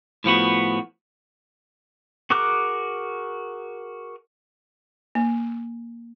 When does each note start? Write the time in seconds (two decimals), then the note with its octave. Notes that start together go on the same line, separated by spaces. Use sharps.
0.24 A2 F3 B3 F#4
2.30 F#4 G#4 A#4 D6 F#6
5.15 A#3